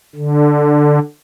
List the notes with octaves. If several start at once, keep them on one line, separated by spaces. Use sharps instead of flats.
D3